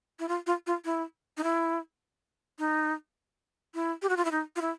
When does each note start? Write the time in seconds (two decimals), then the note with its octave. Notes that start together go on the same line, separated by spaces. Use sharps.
0.19 E4
0.28 F4
0.47 F4
0.67 F4
0.85 E4
1.37 D#4
1.43 E4
2.58 D#4
3.74 E4
4.02 G4
4.09 F#4
4.17 F4
4.25 E4
4.31 D#4
4.56 F4
4.61 E4